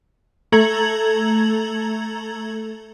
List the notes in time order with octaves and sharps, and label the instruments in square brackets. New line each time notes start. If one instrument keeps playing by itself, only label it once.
[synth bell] A3 A4 A#5 G#6 F#7